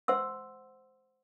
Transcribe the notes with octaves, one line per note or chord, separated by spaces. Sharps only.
C5 F#5 C6 E6